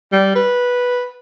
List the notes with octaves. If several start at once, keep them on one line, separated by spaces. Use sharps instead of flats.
G3
B4